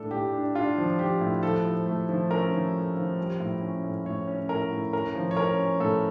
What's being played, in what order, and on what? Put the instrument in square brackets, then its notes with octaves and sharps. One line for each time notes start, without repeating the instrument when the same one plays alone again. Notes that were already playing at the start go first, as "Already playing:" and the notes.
Already playing: [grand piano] A2 D4 A4
A2 G4
D4
D4 F4
F3
F3 G4
A2
F3 A4
F3
A3
F3
C#4 A#4
F3
A3
F3
G3
A2
C#4
A2
A2 C#5
C#4
A2 A#4
A2
C#4 A#4
F3
C#5
C#4 A#4
C#4
A2 A4